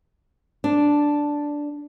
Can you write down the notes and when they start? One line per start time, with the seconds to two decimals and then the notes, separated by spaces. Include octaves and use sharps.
0.64 D4